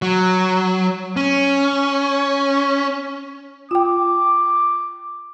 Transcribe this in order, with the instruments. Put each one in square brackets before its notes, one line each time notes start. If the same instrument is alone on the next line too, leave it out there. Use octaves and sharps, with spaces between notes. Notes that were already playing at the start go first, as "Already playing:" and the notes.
[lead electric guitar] F#3
C#4
[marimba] F4 G5 [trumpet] D6